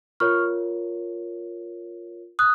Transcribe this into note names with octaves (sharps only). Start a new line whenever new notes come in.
F4 A#4 C#5 C#6 F6
D#6 F#6